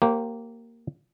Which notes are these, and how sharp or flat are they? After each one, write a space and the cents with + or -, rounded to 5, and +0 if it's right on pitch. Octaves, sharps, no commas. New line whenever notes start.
A#3 -10 G4 -20 C5 +40